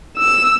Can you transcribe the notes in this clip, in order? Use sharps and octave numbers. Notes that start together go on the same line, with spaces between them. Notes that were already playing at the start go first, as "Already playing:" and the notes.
E6